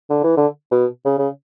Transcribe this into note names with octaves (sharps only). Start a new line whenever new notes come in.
D3
E3
D3
B2
C#3
C#3